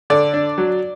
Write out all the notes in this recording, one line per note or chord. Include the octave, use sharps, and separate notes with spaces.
D3 D5
D4
F#3